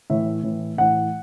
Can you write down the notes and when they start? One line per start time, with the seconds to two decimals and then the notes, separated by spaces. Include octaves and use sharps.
0.10 A2 E3 E5
0.43 A2 E3
0.78 A2 E3 F#5